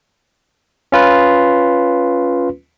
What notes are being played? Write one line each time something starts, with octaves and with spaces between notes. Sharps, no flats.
C#4 F4 B4